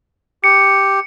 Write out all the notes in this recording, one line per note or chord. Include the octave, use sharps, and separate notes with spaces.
G4 C#7